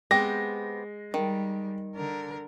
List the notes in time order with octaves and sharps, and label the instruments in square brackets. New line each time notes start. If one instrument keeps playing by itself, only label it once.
[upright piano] G#3 [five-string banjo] B3 C4 G4 [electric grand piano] A#6
[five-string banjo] D#3 [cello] G3
[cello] D3 A#4